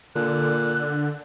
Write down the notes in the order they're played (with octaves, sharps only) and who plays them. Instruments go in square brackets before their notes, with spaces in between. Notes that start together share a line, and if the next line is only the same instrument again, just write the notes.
[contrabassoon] A#2 [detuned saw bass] D3 [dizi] F#6